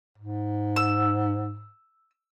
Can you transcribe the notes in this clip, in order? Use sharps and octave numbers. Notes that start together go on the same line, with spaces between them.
G#2
E6